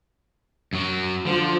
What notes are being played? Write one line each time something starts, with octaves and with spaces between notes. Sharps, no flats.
F#2 F#3
D3 F3